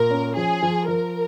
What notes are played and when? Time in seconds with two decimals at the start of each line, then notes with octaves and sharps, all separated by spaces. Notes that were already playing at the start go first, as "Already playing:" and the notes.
Already playing: A#2 A#4
0.10 C#4
0.36 F3 G#4
0.62 F3
0.88 F3 A#4